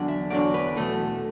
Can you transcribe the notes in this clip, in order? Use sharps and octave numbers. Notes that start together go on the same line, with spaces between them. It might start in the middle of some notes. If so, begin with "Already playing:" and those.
Already playing: E2 D3 F#3 D4
E5
E2 D3 F#3 D4 D5
B4
E2 B2 A3 A4